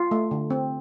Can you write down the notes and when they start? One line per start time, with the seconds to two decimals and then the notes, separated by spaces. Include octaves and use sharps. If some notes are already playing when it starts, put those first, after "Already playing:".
Already playing: F4
0.11 A3
0.31 D3
0.50 C4